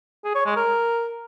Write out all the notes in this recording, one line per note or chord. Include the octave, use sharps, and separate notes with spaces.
G#4
C#5
G#3
A#4